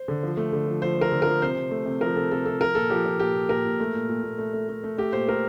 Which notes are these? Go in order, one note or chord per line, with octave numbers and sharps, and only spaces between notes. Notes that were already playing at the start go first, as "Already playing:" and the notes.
Already playing: C5
D3
F3
A3
D3
F3
F3 C5
A3 A#4
D3
F3 A#4
C3 C5
C3
A3
C3
F3 A#4
C3 A4
C3 A4
C3 A4
F3 A#4
A#2 A4
F3 G4
F3
A#2 G4
A#2
A#2 A#4
A#2
A3
A#2
A#2
A#2
A3
A3
A3
A3
A3 G4
A#2 C5
A3 A#4